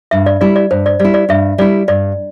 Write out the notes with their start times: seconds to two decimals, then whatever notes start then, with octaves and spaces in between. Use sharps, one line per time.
0.11 G2 E5
0.26 D5
0.41 G3 E4 D5
0.56 D5
0.71 G2 C5
0.86 D5
0.99 G3 D5
1.05 E4
1.14 D5
1.29 G2 E5
1.58 G3 E4 D5
1.88 G2 D5